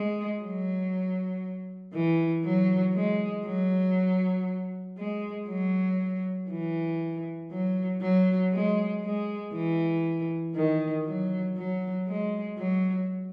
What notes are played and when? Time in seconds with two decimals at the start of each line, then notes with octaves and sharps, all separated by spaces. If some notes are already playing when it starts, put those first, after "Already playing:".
Already playing: G#3
0.41 F#3
1.93 E3
2.44 F#3
2.95 G#3
3.45 F#3
4.97 G#3
5.48 F#3
6.50 E3
7.51 F#3
8.01 F#3
8.52 G#3
9.03 G#3
9.54 E3
10.55 D#3
11.06 F#3
11.56 F#3
12.07 G#3
12.58 F#3